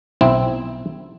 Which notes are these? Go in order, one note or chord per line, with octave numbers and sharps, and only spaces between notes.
B1 C4 E4